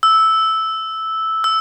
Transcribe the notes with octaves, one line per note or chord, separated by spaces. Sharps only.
E6
E6